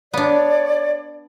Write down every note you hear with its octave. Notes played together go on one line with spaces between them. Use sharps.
B3 D4 C#5 D5